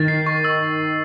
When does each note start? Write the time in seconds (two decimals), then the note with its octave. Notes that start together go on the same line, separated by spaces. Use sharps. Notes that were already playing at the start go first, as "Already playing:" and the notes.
Already playing: D#3 A6
0.08 C7
0.26 C#6
0.44 E6